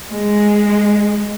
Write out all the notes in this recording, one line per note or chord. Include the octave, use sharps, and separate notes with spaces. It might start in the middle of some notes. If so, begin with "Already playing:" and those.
G#3